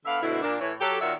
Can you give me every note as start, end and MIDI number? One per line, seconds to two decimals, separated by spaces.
0.05 0.18 50
0.05 0.18 59
0.05 0.18 62
0.05 0.18 76
0.05 0.18 77
0.21 0.38 38
0.21 0.38 47
0.21 0.38 50
0.21 0.38 60
0.21 0.38 64
0.42 0.57 46
0.42 0.57 58
0.42 0.57 62
0.60 0.73 45
0.60 0.73 52
0.60 0.73 73
0.80 0.99 54
0.80 0.99 67
0.80 0.99 69
1.01 1.13 46
1.01 1.13 51
1.01 1.13 66
1.01 1.13 73
1.01 1.13 74
1.01 1.13 76